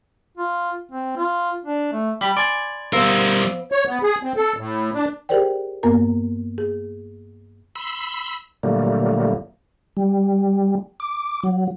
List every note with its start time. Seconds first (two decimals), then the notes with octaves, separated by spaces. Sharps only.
0.38 F4
0.92 C4
1.17 F4
1.65 D4
1.93 A3
2.21 G3 G4 B5 B6
2.37 D5 G#5 C6
2.93 G3 B3 A#4 C5 F5 E6 A#6
3.72 C#5
3.87 B3
4.03 G#4
4.23 C4
4.36 A4
4.57 A2
4.94 D4
5.29 G4 G#4 A#4 C5 D5 G5
5.83 G2 A#3 B3 A#4 A#5
6.58 G#4
7.76 B5 C6 E6
8.63 A#2 D3 F#3 G3 A3 A#3
9.97 G3
11.00 D6
11.43 F#3